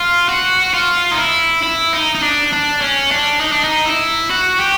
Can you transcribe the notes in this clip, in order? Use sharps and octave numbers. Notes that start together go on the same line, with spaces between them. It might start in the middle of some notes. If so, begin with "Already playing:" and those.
Already playing: F4
F#4
F4
D#4
E4
E4
D#4
D#4
D4
D4
C#4
D4
D#4
D4
D#4
E4
F#4
G4